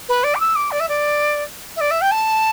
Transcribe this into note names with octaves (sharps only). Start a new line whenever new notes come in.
B4
D5
D6
E6
D6
D5
E5
D5
E5
D5
E5
G5
A5